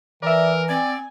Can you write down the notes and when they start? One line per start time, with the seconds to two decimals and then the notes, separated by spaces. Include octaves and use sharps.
0.22 E3 A#4 D5 E5
0.69 C4 D5 G#5